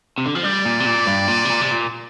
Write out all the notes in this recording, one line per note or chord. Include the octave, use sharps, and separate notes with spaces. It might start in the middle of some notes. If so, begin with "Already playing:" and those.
C3
D3
F3
G3 D5
A#2
C3
A#2
G2
A#2
C3
A#2
C3
A#2